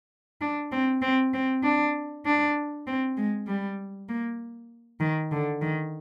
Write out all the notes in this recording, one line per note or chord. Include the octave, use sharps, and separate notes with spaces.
D4
C4
C4
C4
D4
D4
C4
G#3
G3
A#3
D#3
D3
D#3